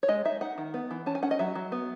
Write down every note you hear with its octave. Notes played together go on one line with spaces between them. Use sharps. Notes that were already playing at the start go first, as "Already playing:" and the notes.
C#5
G#3 D#5
D#4 E5
D#4 F#5
D#3
B3
E3
C#4 A5
G#5
C#4 F#5
D#5
F#3 E5
F#3
B3